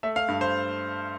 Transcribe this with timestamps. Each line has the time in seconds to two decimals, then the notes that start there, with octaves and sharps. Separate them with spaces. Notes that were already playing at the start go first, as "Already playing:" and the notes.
0.03 A3 E5
0.16 F5
0.28 G2
0.41 C5